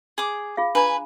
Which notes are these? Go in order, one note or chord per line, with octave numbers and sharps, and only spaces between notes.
G#4 D6
F4 G#4 F5
D4 B4 G#5 A#5 B5